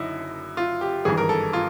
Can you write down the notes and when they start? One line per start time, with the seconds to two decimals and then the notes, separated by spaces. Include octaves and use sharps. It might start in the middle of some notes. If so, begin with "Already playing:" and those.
Already playing: F#1 F#2 D3 D#4 E4
0.57 F4
0.81 G4
1.05 G#1 G2 E3 G#4
1.17 A#4
1.29 A4
1.53 F4